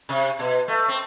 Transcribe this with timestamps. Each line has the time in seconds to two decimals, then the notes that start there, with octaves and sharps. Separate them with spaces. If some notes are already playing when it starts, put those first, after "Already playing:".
0.09 C3
0.39 B2
0.68 A3
0.88 C4